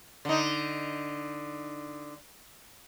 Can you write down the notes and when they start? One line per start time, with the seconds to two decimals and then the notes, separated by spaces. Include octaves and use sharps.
0.25 D3 D#4